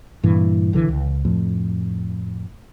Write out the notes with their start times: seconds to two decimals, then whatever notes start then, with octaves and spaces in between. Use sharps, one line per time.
0.23 G2 A#2 E3
0.73 B1 D3 E3
0.89 C#2
1.25 F2 A2 F3